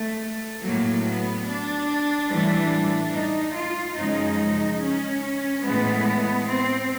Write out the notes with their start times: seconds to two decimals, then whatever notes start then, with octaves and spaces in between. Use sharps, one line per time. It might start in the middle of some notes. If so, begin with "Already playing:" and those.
Already playing: A3
0.62 A2 F#3 A#3
1.04 B3
1.46 D4
2.29 A2 E3 G3
3.13 D#4
3.55 F4
3.96 F#2 C#3 F3 G#3 D#4
4.80 C#4
5.63 A2 E3 G#3 B3
6.48 C4